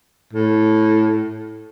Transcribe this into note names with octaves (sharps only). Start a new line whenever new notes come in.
A2